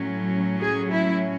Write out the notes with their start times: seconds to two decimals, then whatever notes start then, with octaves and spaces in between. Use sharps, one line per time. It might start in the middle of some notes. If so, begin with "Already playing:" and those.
Already playing: A2 F#3 C#4
0.61 G#4
0.92 E4